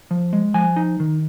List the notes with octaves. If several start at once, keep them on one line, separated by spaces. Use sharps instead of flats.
F3
G#3
F3 G#5
D#4
D#3